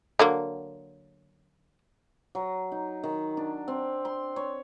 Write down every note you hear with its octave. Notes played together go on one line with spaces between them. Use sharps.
D3 F#3 A#3
F#3
D#4
D#3
D4
C4
C6
C#5